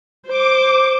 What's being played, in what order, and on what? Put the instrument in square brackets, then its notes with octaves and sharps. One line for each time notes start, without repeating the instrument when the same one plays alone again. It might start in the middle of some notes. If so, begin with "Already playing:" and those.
[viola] C5 [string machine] D6